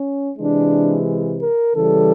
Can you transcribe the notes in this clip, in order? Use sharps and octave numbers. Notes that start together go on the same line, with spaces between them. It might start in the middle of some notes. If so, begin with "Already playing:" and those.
Already playing: C#4
C3 E3 G#3 D4
A#4
C#3 E3 G3 A4